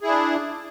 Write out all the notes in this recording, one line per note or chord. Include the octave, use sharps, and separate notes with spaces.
D4 E4 G#4